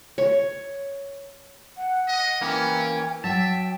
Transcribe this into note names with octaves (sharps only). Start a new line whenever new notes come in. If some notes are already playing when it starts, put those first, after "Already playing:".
C#5
F#5
D#5
E3 A#3 C#4 G5
F#3 E5 G5 A5